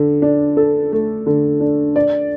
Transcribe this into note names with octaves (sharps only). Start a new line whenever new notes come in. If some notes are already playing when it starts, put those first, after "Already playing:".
Already playing: D3
D4
A4
A3
D3
D4
D5